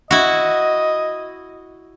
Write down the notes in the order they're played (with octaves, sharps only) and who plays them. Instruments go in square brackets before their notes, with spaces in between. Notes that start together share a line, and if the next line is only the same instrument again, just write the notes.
[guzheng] E4 F#4 [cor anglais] D#5